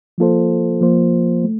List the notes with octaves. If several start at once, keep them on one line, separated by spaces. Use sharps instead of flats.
F3 A#3 F4 A4 C5
F3 A#3 F4 C5
A3